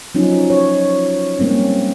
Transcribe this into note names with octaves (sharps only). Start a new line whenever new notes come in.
F3 F#3 C#4 D#4
C#5
G3 G#3 A#3 C4 C#4